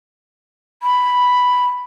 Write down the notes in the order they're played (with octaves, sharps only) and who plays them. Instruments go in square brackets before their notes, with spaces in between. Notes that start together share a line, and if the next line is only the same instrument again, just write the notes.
[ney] B5